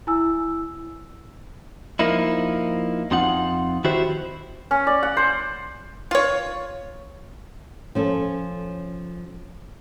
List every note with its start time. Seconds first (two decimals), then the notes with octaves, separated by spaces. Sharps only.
0.07 E4 G#5 E6
1.99 F3 A#3 D#4 E4
3.11 F2 C4 D#4 F4 F#5
3.84 D#3 E4 F#4 G4 C5
4.71 C#4
4.87 D5
5.03 F#5
5.17 C5
6.11 F4 C#5
7.95 F3 C#4 A4